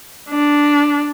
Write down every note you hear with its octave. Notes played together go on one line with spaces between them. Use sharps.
D4